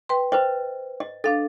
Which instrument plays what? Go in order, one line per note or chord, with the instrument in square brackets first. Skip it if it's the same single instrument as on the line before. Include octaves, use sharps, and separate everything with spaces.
[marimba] B4 G5 C6
[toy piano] B4 C5 D#5 [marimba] G5
[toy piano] D#5
[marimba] D4 F5 A6 [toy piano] A4